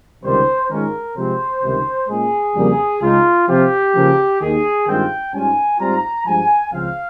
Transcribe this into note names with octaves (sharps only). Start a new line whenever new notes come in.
C#2 C3 D#3 G3 C5
G#2 D#3 G#3 C#4 F4 A#4
C3 F3 G#3 C4 C5
C#2 C3 D#3 G3
A#2 G#3 C#4 G#4
F2 C#3 G3 A#3
C#2 C#3 G#3 D#4 F4
C3 F3 C4 F4 G4
C#3 F3 A#3
D#2 D#3 A#3 G#4
G2 D#3 G#3 C4 F4 G5
G#2 G3 C#4 F4 G#5
G#2 G3 C4 F4 A#5
G2 F3 G#3 G#5
C#2 C#3 F3 C4 F5